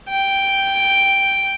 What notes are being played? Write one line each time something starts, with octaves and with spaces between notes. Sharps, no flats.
G5